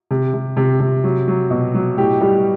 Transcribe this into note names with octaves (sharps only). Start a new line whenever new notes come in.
C3
C3
C3
C3
F#3
F#3
B2
F#3
A2 G4
G3